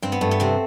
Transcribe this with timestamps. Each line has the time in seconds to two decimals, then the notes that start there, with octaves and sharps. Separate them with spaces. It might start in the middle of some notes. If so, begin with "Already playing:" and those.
0.02 G2 C4
0.12 B3
0.21 G2 A3
0.31 B3
0.40 C3 C4